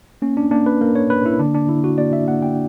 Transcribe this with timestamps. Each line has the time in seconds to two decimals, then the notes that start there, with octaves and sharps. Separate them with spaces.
0.22 A#3 C#4
0.37 D4
0.51 A#3 D4
0.66 B4
0.81 A#3 A#4
0.95 C#5
1.10 A#3 B4
1.26 E4
1.39 D3 D4
1.54 D4
1.69 D3 E4
1.84 F#4
1.98 A#3 D5
2.13 E5
2.28 A#3 F#5
2.42 G5